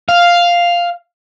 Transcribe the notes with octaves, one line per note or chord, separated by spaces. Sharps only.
F5